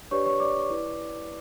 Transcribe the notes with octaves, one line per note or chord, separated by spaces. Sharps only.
D4 G4 B4 C#5 D5 C#6
C#5 C#6
D5 D6
E4 B4 D5